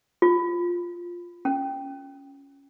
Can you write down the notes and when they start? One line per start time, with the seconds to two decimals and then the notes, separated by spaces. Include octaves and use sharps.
0.22 F4
1.45 C#4